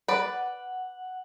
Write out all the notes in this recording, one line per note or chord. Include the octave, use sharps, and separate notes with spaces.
B4 D5 F#5